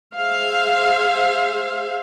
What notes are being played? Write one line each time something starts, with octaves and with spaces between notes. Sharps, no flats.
G#4 C5 E5 F5